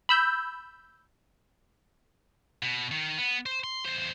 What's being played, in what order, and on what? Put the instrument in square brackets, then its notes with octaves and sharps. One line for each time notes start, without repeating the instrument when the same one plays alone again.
[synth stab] B5 E6 G6
[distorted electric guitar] B2
D#3
B3
C5
C6
E2 C5